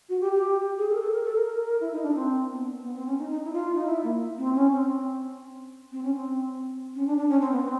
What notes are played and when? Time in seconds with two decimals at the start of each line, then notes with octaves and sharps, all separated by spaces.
0.09 F#4
0.21 G4
0.33 G4
0.78 G#4
0.89 A4
0.95 A#4
1.00 A4
1.12 A#4
1.24 A4
1.35 A#4
1.47 A#4
1.64 A#4
1.81 E4
1.92 D#4
2.03 D4
2.15 C4
2.49 B3
2.83 B3
2.96 C4
3.06 C#4
3.18 D#4
3.30 D#4
3.45 E4
3.53 F4
3.75 D#4
3.86 E4
4.04 A#3
4.38 C4
4.55 C#4
4.72 C4
5.92 C4
6.03 C#4
6.15 C4
6.95 C#4
7.07 D4
7.17 D4
7.29 C#4
7.41 C4
7.52 B3
7.63 C4